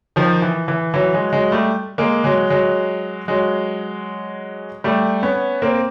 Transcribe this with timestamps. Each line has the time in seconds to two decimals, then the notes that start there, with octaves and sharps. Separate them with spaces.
0.16 D#3 F3
0.42 E3
0.68 E3
0.94 E3 F#3
1.14 F#3 G#3
1.33 F#3 G#3
1.52 G3 A3
1.98 G#3 A#3
2.24 F#3 G#3
2.50 F#3 G#3
3.28 F#3 G#3
4.84 G3 A3
5.23 B3 C#4
5.62 A#3 C4